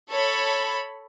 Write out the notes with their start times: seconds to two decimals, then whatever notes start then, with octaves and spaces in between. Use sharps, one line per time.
0.11 A4 C#5 B5